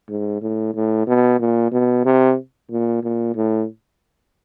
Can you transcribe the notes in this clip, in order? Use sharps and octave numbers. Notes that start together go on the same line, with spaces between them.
G#2
A2
A2
B2
A#2
B2
C3
A#2
A#2
A2